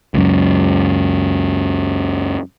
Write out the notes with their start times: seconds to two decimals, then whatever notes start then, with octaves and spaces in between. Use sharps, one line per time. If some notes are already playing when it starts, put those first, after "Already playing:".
0.14 C#2 F#2